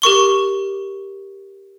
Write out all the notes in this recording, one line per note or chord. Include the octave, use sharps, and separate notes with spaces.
G4 A#4 C#6 G7